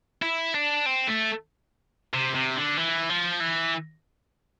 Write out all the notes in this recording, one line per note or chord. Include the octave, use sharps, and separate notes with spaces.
E4
D4
C4
A3
C3
C3
D3
E3
F3
E3